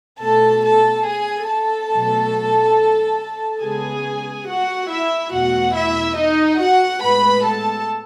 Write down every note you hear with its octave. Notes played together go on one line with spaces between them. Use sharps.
B2 A3 A4 A5
A4 A5
G#4 G#5
A4 A5
B2 F#3 A3
C#3 G#3 B3 G#4 G#5
F#4 F#5
E4 E5
E2 B2 A3 F#4 F#5
E4 E5
D#4 D#5
F#4 F#5
A2 G#3 B3 B4 B5
A4 A5